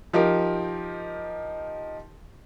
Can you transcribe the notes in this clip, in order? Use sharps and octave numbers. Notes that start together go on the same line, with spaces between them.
F3 D#4 G4 A#4